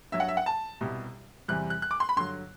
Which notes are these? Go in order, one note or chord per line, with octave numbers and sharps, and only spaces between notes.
G2 F#3 E5
F#5
E5
F#5
A5
C2 B2 G3
E2 C3 G3 F#6
F#6
F#6
D6
C6
B5
G2 D3 F#3 C6